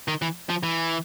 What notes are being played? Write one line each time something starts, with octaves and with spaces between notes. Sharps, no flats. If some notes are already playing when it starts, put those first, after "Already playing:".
D#3
E3
F3
E3